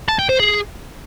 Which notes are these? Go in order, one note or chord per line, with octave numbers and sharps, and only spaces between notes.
A5
G5
C5
G#4